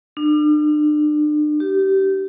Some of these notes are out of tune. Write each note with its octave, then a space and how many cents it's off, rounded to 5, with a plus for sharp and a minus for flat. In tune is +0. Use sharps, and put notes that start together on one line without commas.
D4 +40
G4 -25